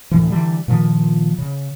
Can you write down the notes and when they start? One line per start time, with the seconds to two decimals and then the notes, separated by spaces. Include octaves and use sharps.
0.11 D2 A2 E3
0.30 D3 E3 G3
0.68 A#2 D#3 F3
1.38 C#3